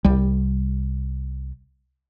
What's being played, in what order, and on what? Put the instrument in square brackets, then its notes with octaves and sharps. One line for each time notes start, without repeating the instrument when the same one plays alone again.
[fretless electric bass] C2 G3